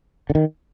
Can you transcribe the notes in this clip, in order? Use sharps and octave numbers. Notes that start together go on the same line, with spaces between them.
D3
D#3